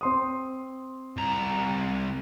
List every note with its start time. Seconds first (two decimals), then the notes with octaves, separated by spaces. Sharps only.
0.01 C4 C6 D#6
1.17 C2 A#5